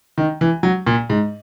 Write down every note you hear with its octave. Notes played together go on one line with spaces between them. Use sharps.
D#3
E3
F#3
A#2
G#2